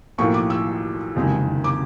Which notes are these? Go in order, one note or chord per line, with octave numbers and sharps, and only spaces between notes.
B1 A2 F3 A#3 C#6
D6
E6
F#1 F2 C3 D#3 G#3
D6